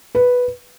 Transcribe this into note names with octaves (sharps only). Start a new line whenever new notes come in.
B4